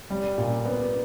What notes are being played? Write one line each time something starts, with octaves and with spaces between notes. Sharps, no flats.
G3
A#2
B3